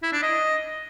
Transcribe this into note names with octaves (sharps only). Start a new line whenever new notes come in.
E4
D4
D#5